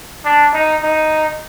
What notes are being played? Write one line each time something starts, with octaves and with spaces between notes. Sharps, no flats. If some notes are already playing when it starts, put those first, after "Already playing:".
D4
D#4
D#4